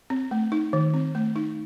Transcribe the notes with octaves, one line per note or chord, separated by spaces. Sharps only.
C4
A3
D#4
D#3
C4
A3
D#4